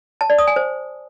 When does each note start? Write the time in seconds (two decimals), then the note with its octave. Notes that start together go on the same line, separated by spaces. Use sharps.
0.21 A5
0.30 D5
0.39 D#6
0.47 G#5
0.56 C5